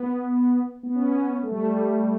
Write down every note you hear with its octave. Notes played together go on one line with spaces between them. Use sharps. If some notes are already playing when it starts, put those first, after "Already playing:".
Already playing: B3
B3
C#4
B3
A3
G3
G3